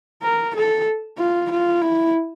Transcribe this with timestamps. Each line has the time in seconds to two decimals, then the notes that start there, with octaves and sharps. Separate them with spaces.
0.23 A#4
0.55 A4
1.18 F4
1.51 F4
1.82 E4